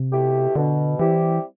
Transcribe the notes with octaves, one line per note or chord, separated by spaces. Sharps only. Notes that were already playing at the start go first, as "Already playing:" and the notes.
Already playing: C3
B2 A3 E4 G4
B2 D3
E3 G3 C4 E4 G4